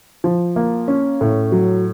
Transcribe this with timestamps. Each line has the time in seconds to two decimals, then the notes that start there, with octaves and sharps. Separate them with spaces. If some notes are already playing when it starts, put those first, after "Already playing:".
0.24 F3
0.56 A#3
0.88 C#4
1.21 A2
1.52 F#3